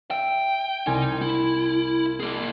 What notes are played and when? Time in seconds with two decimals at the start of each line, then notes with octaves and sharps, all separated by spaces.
0.11 E5 G5
0.87 C2 D#4 G#5 G#6
1.22 E4
2.20 A#3 G#4